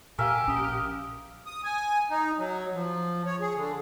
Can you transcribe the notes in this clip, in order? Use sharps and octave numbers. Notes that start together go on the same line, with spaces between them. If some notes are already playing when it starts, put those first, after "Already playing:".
A#2 G4 A#4 E5 F5 G#5
A#1 C#4 D#6
D#6
G#5
D#4
F#3
F3
C#5
G#4
D3